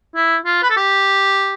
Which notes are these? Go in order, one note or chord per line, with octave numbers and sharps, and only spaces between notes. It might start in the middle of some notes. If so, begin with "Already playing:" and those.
E4
F4
B4
A4
G4